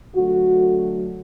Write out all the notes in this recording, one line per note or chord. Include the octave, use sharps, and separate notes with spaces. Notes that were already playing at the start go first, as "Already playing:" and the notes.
D3 F#3 A3 F#4